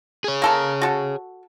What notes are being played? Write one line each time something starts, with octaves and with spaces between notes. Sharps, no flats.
G#4 C#5
A#3 A4 A#4
F#4 A4